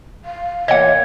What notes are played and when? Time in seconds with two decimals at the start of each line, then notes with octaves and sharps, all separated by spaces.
0.25 F5
0.68 A#2 E3 C#5 D#5 F#5 G#6